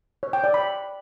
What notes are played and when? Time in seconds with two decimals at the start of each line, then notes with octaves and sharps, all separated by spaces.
0.23 C#5
0.33 G5
0.44 D5
0.54 B5